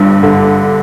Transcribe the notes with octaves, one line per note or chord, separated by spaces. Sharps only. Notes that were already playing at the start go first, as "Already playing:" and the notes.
Already playing: G1 G2
D3